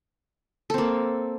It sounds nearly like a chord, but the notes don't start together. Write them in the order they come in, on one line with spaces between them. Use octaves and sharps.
A4 C4 A#3